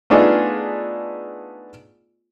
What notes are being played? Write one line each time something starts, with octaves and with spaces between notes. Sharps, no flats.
A3 B3 D4 D#4 F4 G#4